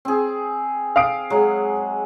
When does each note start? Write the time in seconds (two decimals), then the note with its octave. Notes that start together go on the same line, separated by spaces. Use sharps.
0.05 C4 G#4
0.96 F5 D#6 D7
1.30 F#3 G#3